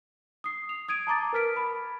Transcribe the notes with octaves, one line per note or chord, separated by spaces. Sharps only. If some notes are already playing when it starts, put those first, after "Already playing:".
D#6 C7
F7
D#6 G#6 D7 D#7
A5 A#5 D6 A6
A#4 B4 F6 B6 D7
B5